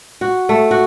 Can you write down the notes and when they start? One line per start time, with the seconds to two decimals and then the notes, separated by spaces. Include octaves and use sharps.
0.21 F#4
0.49 A3
0.71 F#4